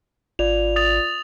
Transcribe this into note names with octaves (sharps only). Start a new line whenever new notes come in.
G#1 F4 D5 F7
D#6 A6 F7